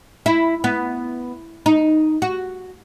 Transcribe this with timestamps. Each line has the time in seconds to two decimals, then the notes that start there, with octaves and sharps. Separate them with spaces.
0.26 E4
0.64 B3
1.66 D#4
2.22 F#4